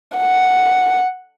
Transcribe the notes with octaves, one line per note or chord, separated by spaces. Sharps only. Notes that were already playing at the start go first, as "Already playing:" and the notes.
F#5